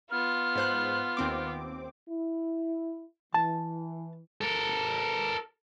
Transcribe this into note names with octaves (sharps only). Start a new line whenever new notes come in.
B3 F4 F6
G#2 C5 F#6
D#2 C4 D6
E4
E3 A5
A4 A#4